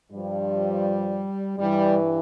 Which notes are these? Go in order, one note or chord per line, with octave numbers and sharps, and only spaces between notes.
G2 F3 G3
G2 E3 G3